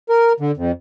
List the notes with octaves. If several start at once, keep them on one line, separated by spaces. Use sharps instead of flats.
A#4
D3
F2